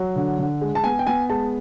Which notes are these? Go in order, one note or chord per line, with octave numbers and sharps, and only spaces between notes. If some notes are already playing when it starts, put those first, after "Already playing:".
Already playing: F#3
D3
D3
G#3
A5
B3 G#5
G5
B3 G#5
G#3 A5